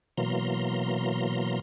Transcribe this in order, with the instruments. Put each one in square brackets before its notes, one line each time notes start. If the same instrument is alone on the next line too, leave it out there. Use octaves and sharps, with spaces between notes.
[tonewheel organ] B2 E3 F#3 A#3 A#5 C6